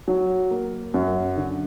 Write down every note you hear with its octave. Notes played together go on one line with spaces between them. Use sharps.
F#3
A#3
F#2
D3